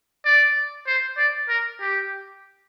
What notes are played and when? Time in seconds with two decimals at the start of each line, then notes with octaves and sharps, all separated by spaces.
0.25 D5
0.87 C5
1.18 D5
1.49 A#4
1.81 G4